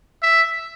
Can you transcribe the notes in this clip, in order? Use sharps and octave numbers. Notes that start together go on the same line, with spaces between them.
E5